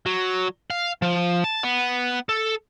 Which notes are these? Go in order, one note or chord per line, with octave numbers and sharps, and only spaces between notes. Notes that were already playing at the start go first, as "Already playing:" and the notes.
F#3
F5
F3
A5
B3
A4